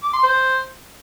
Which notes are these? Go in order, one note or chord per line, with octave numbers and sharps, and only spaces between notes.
D6
C6
C5